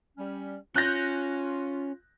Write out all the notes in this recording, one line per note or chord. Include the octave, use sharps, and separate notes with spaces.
G3 C#4
C#4 F4 F#6 G6 A#6